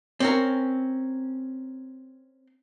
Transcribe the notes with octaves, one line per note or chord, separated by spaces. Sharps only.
C4 C#4 A#4